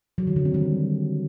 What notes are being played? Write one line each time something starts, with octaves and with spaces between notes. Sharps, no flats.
F#3
D#3
D3
C4
G3